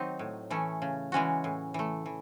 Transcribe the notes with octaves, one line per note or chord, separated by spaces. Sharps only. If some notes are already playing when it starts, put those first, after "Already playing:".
Already playing: D#3 F#3 C4 D#4
A2
E3 A3 C#4
C#3
E3 G#3 C#4 F#4
A2
E3 A3
E3